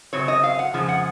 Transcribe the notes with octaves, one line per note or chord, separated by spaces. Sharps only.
F#2 C#3 F#3 C4 C#5
D#5
F5
F#5
F2 C#3 F3 G#3
F#5